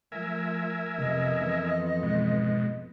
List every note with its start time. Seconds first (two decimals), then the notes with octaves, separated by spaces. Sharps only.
0.12 F3 A3 A#4 E5 G#5
0.98 F2 C3 B3 D#5
1.41 E3
2.03 G#2 B2